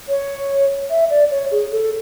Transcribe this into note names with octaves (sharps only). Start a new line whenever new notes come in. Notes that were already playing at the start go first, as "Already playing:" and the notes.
C#5
E5
D5
C#5
G#4
A4